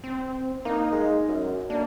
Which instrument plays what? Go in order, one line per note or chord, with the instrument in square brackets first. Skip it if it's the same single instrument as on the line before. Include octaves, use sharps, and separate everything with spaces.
[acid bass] C4
[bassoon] A#3 [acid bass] D#4
[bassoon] G#3
F#2
[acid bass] A#3 [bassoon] D4